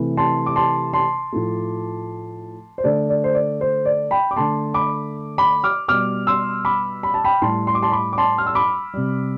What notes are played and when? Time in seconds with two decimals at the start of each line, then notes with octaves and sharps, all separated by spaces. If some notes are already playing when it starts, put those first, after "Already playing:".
Already playing: C3 E3 A3
0.17 A5 C6
0.46 D6
0.56 A5 C6
0.93 A5 C6
1.32 A2 F3 A3
2.78 C5
2.84 D3 A3 D5
3.10 D5
3.24 C5
3.34 D5
3.61 C5
3.85 D5
4.11 G5 B5
4.31 D6
4.36 D3 A3 A5 C6
4.74 B5 D6
5.38 B5 D6
5.64 D6 F6
5.88 B2 G3 D6 F6
6.27 C6 E6
6.65 B5 D6
7.03 B5
7.14 A5
7.24 G5 B5
7.42 A2 G3 A5 C6
7.67 C6
7.75 D6
7.82 A5 C6
7.92 B5 D6
8.13 D6
8.18 A5 C6
8.38 F6
8.46 E6
8.55 B5 D6
8.94 C3 G3